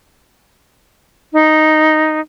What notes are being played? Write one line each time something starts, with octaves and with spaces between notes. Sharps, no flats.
D#4